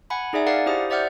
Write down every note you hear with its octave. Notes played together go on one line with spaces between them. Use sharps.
F#5 G#5 B5
D#4 G#4 D5 E5 G#5
A#4 D5 F5 F#5 A6
D4 E4 G4 C5 D#6
C5 D5 E5 F#5 F6 G6